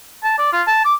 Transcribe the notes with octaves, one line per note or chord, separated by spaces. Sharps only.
A5
D5
F4
A5
D6